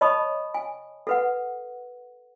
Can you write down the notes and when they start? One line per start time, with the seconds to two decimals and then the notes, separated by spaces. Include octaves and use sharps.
0.01 C#5 D#5 A5 B5 C#6 D#6
0.54 G#5
1.07 A4 B4 F#5